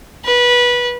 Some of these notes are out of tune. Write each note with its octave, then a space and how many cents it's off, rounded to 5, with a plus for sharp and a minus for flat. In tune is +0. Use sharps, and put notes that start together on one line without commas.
B4 -20